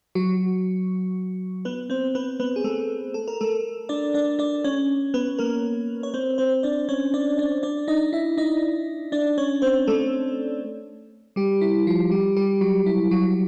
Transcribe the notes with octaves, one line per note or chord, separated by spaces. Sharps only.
F#3 F#4
B3 B4
C4 C5
B3 B4
B3 B4
G#4
A3 A4
A4
A#4
A3 A4
D4 D5
D4 D5
D4 D5
C#4 C#5
B3 B4
A#3 A#4
C#5
C4 C5
C4 C5
D4 D5
C#4 C#5
D4 D5
D4 D5
D4 D5
D#4 D#5
E4 E5
D#4 D#5
D4 D5
C#4 C#5
C4 C5
A3 A4
G3 G4
E4
F3 F4
G3 G4
G3 G4
F#3 F#4
E4
F#3 F#4